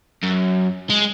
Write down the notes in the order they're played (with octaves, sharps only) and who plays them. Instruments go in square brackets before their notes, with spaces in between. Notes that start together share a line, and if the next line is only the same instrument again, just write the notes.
[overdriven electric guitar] F#2
G#3